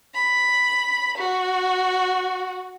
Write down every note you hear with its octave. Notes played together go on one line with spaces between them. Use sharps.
B5
F#4